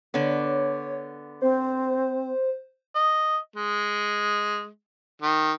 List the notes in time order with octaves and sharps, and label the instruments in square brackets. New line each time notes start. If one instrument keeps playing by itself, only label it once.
[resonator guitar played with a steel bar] D3 B3 [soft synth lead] C#5
[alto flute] C4 [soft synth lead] C5
[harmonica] D#5
G#3
D#3